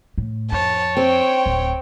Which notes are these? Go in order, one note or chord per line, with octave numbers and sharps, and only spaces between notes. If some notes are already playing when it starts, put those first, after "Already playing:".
A2
F2 C#5 A5
C4 G5
D1